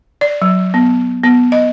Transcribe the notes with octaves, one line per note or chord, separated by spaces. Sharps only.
D5
F#3
B3
B3
D#5